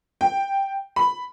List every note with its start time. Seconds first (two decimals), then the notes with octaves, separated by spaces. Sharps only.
0.21 G5
0.96 B5